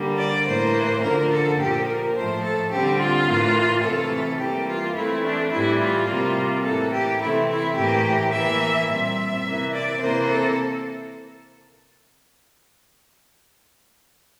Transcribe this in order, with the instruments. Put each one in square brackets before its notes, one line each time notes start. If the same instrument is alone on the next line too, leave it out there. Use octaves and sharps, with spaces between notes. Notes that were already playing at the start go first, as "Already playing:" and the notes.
Already playing: [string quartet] D3 G3 A#3
D5
A2 E3 A#3 C5
D3 F3 A#3 A#4
A4
A#2 F3 A#3 G4
A#4
A2 F3 A3 C5
A4
D3 G3 C4 G4
F4
A2 E3 A#3
C3 E3 A3 A4
E3 G3 A#3 G4
F4
E3 A3 C4 E4
D4
A2 E3 G3 E4
F4
C3 G3 A#3
A2 E3 A#3 A4
G4
C3 E3 A3 C4 E4
E4
A2 E3 A#3 G4
E3 A#3 E5
A#2 G3 C4 E5
C3 E3 A#3
D5
C3 E3 A#3 C5
A4